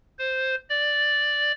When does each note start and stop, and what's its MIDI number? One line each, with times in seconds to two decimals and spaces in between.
0.19 0.55 72
0.70 1.52 74